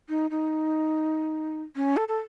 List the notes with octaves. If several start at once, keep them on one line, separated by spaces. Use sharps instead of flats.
D#4
D#4
C#4
A4
A4